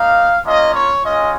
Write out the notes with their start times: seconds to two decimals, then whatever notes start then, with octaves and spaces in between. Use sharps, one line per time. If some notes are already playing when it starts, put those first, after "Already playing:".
Already playing: A#3 D#4 F5
0.44 A#3 C#4 F4 D#5
0.73 C#5
1.03 G#3 C#4 F4 D#5